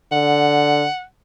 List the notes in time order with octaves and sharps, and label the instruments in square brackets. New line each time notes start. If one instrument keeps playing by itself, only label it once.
[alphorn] D3 [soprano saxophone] F#5